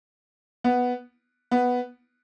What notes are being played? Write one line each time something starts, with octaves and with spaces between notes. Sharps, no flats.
B3
B3